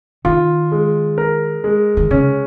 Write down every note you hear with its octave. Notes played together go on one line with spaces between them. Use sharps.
D#3 F4
G#3
A#4
G#3
D#3
C#3 C#4